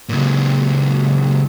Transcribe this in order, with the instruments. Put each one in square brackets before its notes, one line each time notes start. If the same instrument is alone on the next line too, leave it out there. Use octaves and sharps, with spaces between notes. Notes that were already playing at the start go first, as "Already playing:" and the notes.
[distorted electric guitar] C#2 A#2